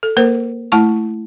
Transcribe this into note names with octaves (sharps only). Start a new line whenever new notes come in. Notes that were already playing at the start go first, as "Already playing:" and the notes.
A4
A#3 A#4 C5
A3 E4 A5 C#6